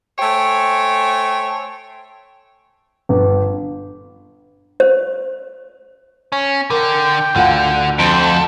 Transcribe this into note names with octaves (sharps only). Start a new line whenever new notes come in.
A3 C5 C#5 G5 G#5
G1
C5
C#4
D3 A#4 G5
D2 D3 F4 F#5
F2 A4 C5